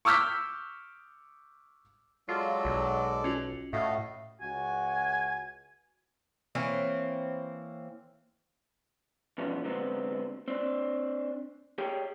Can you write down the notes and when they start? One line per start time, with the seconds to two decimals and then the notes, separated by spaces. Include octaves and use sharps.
0.05 C#6 D6 E6 F6 G6 B6
2.29 F#3 G#3 F4 A4 D5
2.65 B1
3.24 C#4 F4 F#4
3.73 A2 A3 F#4 D#5 F5
4.41 C#2 F#4 G#5
6.55 E3 A#3 C4 C#5
9.38 E2 G2 B2 F3 B3 C#4
9.64 D3 F#3 G#3 B3 C4
10.48 C4 D4
11.78 G4 G#4 C#5 G5